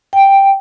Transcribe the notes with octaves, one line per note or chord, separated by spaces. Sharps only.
G5